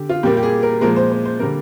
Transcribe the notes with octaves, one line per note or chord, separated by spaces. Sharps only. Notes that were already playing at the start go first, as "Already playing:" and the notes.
Already playing: D3 G4
F4
A#2 G3 A#3 G4
G4
G#4
A#4
A#2 F3 G#3 A#4
C5
C5
C5
D3 G3 A#3 A#4